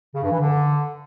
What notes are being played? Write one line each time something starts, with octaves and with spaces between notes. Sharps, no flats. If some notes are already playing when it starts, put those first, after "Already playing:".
C#3
G2
E3
D3